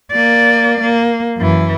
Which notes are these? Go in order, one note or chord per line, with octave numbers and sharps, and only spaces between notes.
A#3 D5
A#3
F#2 E3